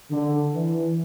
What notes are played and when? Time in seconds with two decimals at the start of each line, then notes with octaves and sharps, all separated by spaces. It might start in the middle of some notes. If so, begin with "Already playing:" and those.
0.12 D3
0.54 E3